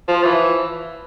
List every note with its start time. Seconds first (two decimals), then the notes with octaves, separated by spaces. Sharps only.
0.08 F3
0.24 E3